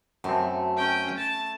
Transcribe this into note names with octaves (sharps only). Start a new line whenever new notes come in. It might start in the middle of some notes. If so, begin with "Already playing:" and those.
F#2 A3 C4
C#4 G5
A5